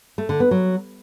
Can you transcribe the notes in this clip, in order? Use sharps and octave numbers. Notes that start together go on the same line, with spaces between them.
A3
D3
B3
F#3